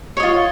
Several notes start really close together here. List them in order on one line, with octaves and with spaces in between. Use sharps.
C#5 D#5 F4